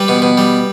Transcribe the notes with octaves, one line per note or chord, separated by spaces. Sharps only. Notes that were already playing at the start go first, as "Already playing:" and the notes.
Already playing: G3 B4
B2
B2
G3